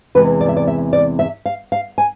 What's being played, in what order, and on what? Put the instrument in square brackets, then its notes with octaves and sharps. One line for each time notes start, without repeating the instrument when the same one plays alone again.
[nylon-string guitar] E2 C3 E3 G#3 B4
D5
E5
D5
E5
D5
E5
F5
F5
G#5